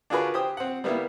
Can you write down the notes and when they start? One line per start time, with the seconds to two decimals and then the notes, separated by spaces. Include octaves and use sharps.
0.10 D4 F4 F#4 G#4 A#4 B4
0.34 G4 C5 D#6
0.57 C4 F#5
0.84 G3 A#3 B3 E4